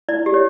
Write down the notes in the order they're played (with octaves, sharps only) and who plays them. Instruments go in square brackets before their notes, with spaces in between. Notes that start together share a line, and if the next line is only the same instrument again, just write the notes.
[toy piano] E4 D5
G4
C#5